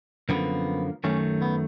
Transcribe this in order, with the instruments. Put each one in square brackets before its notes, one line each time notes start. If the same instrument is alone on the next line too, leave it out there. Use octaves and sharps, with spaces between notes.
[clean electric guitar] F#2 D3 F3 A#3 B3
F#2 D#3 F#3 A3 C#4
B3